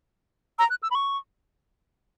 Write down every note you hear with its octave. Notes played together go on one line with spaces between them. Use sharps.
A#5 E6
F#6
E6
B5
C#6